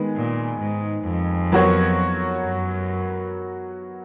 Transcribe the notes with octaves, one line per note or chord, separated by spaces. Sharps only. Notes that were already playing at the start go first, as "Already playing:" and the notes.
Already playing: D#3 G#3 B3
A#2
G#2
F2
F#3 B3 F#4 A#4 C#5
F#2